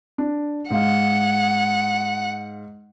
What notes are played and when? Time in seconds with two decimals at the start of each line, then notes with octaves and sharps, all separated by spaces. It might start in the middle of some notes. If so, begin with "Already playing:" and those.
0.18 D4
0.70 G#2 F5 F#5